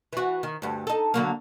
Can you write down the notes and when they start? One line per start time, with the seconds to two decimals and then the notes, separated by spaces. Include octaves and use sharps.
0.13 E3 F#4
0.43 D#3
0.62 D2 G2
0.87 D#4 A4
1.14 D3 F#3 A#3